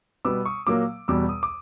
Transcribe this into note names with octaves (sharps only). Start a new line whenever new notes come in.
B2 G3 B3 D6 E6
C#6 D#6
A#2 F#3 A#3 D6 E6
E2 B2 G3 D6 E6
D#6
D6